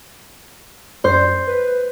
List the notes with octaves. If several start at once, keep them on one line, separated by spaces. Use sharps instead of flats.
F#2 C5
B4